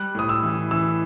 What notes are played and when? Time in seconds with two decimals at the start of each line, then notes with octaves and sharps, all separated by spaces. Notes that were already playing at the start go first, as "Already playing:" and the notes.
Already playing: G3 F#6
0.15 A2 D#6
0.29 E6
0.43 E3
0.71 E3 E6